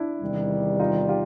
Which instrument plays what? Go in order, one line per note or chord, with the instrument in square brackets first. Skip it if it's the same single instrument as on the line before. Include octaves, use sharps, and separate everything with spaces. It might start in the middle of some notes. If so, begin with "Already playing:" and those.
Already playing: [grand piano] D4 E4
[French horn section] E2 C3 D#3 G3
[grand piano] D#4 F4
F4 G4